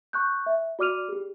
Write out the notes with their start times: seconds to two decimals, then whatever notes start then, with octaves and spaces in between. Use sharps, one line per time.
0.13 C#6 F#6 G6
0.46 E5
0.79 F#4 D5 D6 F6 D#7 F7
1.08 G4 G#4